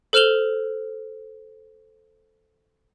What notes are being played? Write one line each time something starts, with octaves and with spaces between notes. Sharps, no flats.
A4 C5 F6 E7 F7 G7